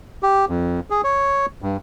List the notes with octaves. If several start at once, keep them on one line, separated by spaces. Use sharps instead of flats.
G4
F2
G#4
C#5
G2